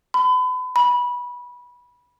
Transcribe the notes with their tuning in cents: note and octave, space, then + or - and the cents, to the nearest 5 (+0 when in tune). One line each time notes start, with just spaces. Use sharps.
B5 +35
B5 -15